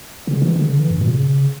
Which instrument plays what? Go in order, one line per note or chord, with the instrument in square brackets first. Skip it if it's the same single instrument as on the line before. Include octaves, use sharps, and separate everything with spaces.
[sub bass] C#3
E3
D3
C#3
D3
E3
G2
A#2
C#3